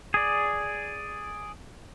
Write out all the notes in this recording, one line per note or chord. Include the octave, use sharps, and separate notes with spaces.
G#4 D5